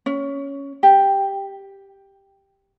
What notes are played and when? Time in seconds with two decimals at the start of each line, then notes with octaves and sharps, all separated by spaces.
0.06 C#4
0.83 G4